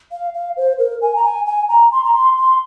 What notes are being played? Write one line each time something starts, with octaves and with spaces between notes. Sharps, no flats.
F5
F5
C5
A#4
G#5
A#5
G#5
G#5
A#5
C6
A#5
C6
C6